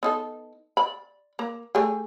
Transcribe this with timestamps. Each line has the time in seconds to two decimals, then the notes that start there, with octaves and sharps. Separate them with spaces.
0.03 B3 D#4 A4
0.77 D5 B5
1.39 A#3 A#5
1.75 A3 G4 G#4